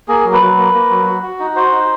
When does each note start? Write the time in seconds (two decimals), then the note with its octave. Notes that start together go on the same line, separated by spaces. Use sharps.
0.08 A#3 G#4
0.25 F#3
0.33 B4
0.41 F#3
0.58 A#3
0.74 A#3
0.90 F#3
1.07 F#4
1.23 F#4
1.39 D#4
1.56 F#4 C5
1.72 D#4